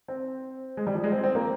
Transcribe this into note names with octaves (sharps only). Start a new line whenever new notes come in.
C4
G#3
G3
F3
G#3
C4
C4
A#3